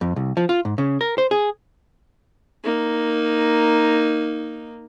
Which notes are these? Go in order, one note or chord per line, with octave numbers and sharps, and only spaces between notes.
F2
C2
F3
F4
G#2
C#3
A#4
C5
G#4
A#3 D#4